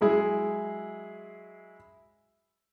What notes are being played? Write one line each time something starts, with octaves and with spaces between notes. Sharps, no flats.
F#3 G#3 E4 G#4